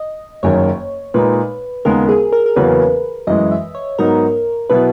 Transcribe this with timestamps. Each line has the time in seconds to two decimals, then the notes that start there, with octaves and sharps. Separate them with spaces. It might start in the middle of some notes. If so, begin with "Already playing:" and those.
Already playing: D#5
0.43 F#1 F#2 D#3 C#5
1.14 A#2 G#3 D#4 B4
1.85 D#2 C#3 G#3 B3 A#4
2.09 G#4
2.33 A#4
2.46 A#4
2.56 E2 C#3 F#3 A#3 C#4 B4
3.27 F#2 E3 G#3 D#5
3.51 E5
3.75 C#5
3.99 G#2 F#3 B3 D#4 A#4
4.70 B2 F#3 B3 E4 B4